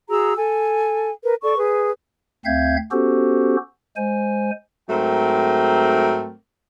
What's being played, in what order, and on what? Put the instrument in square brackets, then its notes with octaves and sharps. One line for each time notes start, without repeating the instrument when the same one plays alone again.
[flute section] F#4 G#4 A#5 E6
A4 G#5
A#4 B4
A4 D5 C#6
G#4 B4
[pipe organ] D2 C4 E5 F5 G6 G#6
B3 C#4 F#4 G4 A4 C5
G#3 C5 G#5
[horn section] G#2 F#3 A3 C4 A#4 G5